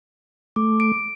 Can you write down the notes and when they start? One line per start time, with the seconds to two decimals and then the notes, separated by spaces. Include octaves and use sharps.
0.56 A3 D6
0.80 D7